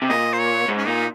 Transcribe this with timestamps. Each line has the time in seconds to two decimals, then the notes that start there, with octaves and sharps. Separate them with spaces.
0.02 C3
0.09 A#2 D#5
0.33 C5
0.39 C#5
0.68 G#2
0.78 C#4
0.87 A#2 D#4